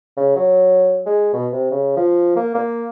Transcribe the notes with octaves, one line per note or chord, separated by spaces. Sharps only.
C#3
F#3
G#3
B2
C3
C#3
F3
A#3
A#3